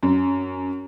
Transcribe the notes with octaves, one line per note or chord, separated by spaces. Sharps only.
F#2